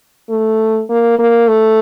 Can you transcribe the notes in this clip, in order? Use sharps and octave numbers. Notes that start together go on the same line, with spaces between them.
A3
A#3
A#3
A3